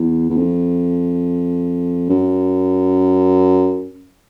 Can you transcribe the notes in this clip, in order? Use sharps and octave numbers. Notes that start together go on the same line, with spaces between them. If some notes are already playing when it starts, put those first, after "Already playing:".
Already playing: E2
E2
F2
F#2